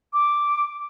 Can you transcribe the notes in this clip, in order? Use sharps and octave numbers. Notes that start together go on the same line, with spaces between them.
D6